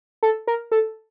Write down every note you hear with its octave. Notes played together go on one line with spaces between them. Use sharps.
A4
A#4
A4